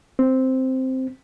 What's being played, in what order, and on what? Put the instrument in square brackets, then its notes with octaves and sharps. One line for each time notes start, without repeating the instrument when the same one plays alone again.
[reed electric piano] C4